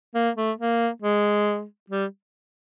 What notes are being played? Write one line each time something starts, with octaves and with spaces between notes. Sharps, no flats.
A#3
A3
A#3
G#3
G3